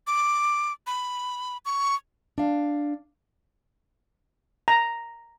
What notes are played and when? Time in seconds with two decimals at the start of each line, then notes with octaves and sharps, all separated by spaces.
0.07 D6
0.87 B5
1.65 C#6
2.38 D4 F5
4.68 A#5